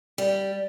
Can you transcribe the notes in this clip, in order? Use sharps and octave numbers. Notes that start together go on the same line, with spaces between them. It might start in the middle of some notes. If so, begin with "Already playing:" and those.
G3